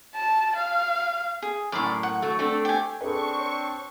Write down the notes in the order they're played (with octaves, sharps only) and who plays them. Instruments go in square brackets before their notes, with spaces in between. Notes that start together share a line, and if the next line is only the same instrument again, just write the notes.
[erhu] A5
F5
[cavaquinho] G#4
[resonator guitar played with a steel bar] F#2 A2 [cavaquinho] D5 B5 C6
[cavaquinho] F#5
[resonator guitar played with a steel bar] F#3 A3
A3 C4 D4
[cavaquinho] G4 G#5
[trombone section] C4 D4 [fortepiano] G#4 B4 [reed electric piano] A4 [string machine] C#6
[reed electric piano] C#5